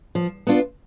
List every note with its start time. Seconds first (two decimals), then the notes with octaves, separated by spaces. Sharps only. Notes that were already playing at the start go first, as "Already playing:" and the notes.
0.15 F3
0.47 B3 D4 F4